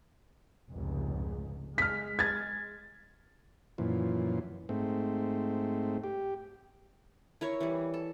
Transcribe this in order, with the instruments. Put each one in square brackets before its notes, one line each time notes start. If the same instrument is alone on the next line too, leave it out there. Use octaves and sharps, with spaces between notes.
[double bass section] F1 C#2 G#2
[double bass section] G#3 [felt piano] F6 B6
[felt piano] G#6 A6
[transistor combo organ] F#2 A#2 E3 F3
G#2 A3 C4
G4
[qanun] E4 A#4 C#5
E3 G3
A4